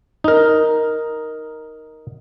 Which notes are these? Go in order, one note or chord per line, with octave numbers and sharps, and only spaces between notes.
D#4 A#4